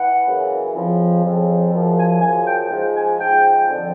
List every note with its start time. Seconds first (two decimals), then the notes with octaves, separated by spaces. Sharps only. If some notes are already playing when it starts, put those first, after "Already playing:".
Already playing: E3 F#5
0.27 F#2 C#3 E3
0.75 F2 C#3 F3
1.24 F2 C#3 F3
1.73 F#2 C#3 F3
1.97 G#5
2.21 F#2 C#3 F3 G#5
2.47 G5
2.71 G#2 F3
2.96 G#5
3.19 G#2 F3 G5
3.68 F2 D3 F3